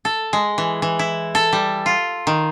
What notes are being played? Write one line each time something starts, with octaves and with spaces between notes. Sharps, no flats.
A4
G#3
E3
E3
E4
A4
G3
F4
D#3